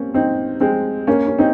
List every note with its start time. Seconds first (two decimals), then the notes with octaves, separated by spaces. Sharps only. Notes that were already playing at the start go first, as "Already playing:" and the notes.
Already playing: A#3 C4 C#4
0.14 C4 D#4
0.61 G#3 C4
1.07 A#3 C#4
1.27 C#4
1.39 C4 D#4